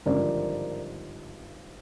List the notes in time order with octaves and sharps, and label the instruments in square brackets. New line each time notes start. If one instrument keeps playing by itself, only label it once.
[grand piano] G#1 G2 D3 F3 A#4 D5